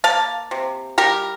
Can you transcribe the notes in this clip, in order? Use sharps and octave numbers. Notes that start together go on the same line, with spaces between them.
A#3 F5 A5
C3
G3 G4 A#4